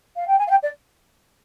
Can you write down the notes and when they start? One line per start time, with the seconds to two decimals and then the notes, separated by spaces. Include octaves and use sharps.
0.16 F5
0.27 G5
0.38 G#5
0.47 F5
0.50 G5
0.62 D5